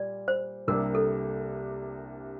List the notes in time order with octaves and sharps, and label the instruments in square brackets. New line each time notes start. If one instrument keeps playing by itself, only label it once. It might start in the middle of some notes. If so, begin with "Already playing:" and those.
Already playing: [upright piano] A#2 G3 [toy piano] D5
[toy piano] C5
[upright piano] C2 C3 G3 A#3 D4 [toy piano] A#4
[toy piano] A4